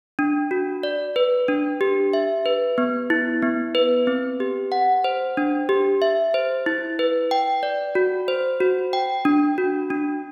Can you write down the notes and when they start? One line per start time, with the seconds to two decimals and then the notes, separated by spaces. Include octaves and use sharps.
0.19 D4
0.51 F#4
0.83 D5
1.16 B4
1.48 D4
1.81 G4
2.13 E5
2.46 B4
2.78 B3
3.10 E4
3.42 B3
3.75 B4
4.07 C4
4.40 G4
4.72 F#5
5.04 C5
5.37 D4
5.69 G4
6.02 E5
6.34 C5
6.66 E4
6.99 B4
7.31 G5
7.63 D5
7.95 F#4
8.28 C5
8.60 F#4
8.93 G5
9.25 D4
9.58 F#4
9.90 D4